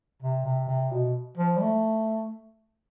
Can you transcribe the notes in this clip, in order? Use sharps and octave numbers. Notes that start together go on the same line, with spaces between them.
C3
C3
C3
B2
F3
G3
A3